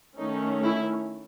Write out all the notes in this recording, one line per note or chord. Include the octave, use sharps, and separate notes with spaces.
D#3 A3 C#4 D#4
E4